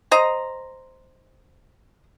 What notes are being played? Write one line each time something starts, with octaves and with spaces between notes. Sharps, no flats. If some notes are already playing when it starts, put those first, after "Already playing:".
C5 D#5 A#5